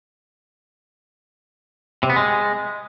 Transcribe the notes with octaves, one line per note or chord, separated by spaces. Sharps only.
C3
B3
G#3